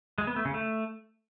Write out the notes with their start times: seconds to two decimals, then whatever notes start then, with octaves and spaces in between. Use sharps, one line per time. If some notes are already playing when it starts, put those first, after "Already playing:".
0.18 G#3
0.27 B3
0.36 A3
0.45 C#3
0.54 A3